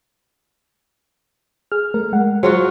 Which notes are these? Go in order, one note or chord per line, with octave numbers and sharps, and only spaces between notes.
G#4 F6
A3 A#4
G#3 F#5
F#3 F4 F#4 G#4 C5